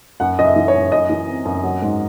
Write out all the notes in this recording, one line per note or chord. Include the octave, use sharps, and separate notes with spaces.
F#2 F#5
F#2 D#5
E5
E3
C#5
F#2
F#2 D#5
E3
C4
F#2
F#3
G#2